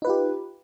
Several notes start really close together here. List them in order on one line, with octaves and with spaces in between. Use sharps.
D#4 B4 F4 G4